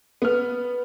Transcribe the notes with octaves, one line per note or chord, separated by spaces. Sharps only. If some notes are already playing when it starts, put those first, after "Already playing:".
B3 F6